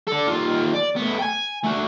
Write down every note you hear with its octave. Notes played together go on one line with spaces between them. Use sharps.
A4 D5
D#2 F4
D5
A2 B3
G5 G#5
A3 F#4